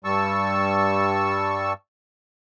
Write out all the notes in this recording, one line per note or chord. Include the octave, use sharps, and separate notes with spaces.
G2 G3 A5 C#6 E6